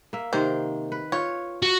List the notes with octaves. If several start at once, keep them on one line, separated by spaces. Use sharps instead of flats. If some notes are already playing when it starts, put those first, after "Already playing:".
A#3 E5
C3 D#3 A#3 C5
B4
F4 C#5
F#4